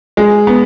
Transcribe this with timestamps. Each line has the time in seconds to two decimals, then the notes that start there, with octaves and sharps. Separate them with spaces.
0.17 G#3
0.47 B3